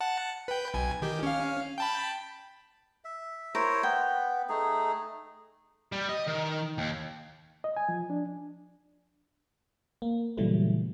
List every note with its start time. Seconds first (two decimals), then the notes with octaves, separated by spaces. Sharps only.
0.01 F#5 A5
0.48 B4 G5
0.74 B1 G#5
1.02 D#3 G4
1.23 C#4 F5
1.78 G5 A5 B5
3.04 E5
3.55 E4 A#4 C5 C#5
3.83 B3 G5
4.49 A3 D#4 G#4
5.92 G3
6.09 D#5
6.27 D#3
6.78 D#2
7.64 D#5
7.77 G#5
7.89 F3
8.10 D4
10.02 A#3
10.37 A#2 C#3 E3 F#3 G3 A3